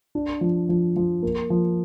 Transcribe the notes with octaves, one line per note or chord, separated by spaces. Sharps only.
D4
F3
F3
F3
A#3
F3